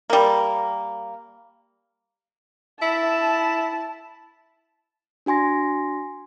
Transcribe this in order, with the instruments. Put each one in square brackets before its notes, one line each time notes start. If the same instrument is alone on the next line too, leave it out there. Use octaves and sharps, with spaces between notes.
[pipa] G3 A#3
[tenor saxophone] E4 [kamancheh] A5
[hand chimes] D4 F#4 G#5 C6 A#6